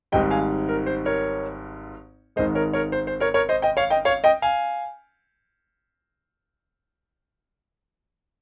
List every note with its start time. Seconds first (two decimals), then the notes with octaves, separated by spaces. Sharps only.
0.12 G#1 G#2 G3 D#5 G5
0.30 F5 G#5
0.69 A#4
0.87 C5
1.05 A#4 C#5
2.36 G#1 G#2 D#3 G#3 C5 D#5
2.55 A#4 C#5
2.73 A#4 C#5
2.92 C5
3.07 C5
3.20 A#4 C#5
3.34 A#4 C#5
3.49 C5 D#5
3.62 D#5 G5
3.77 C#5 F5
3.90 D#5 G5
4.05 C#5 F5
4.24 D#5 G5
4.42 F5 G#5